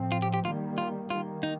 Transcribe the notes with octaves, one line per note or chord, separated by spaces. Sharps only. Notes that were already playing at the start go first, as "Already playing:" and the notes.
Already playing: A2 F3 C4
F4
G4
G4
D#3 G3 A#3 F4
F4
D#3 A#3 F4
D#4